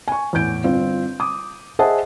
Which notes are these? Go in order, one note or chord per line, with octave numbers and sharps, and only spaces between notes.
G#5 C#6
E2 A2 E3 G6 D7
G1 C4 F4
D6 D#6
G#4 C5 D#5 E5 F#5 A5